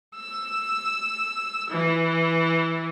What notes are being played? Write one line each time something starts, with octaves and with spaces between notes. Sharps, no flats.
E6
E3